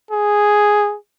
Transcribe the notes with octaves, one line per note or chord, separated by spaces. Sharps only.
G#4